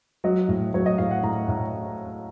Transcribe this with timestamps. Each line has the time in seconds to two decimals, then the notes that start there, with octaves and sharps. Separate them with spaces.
0.24 F#3 D#5
0.48 A2
0.74 F#3 C#5
0.86 D#5
0.98 A2 F5
1.11 F#5
1.23 A2 A#5
1.48 A2